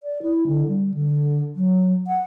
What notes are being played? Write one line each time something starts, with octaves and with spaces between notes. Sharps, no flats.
D5
E4
D3
G3
D3
F#3
F#5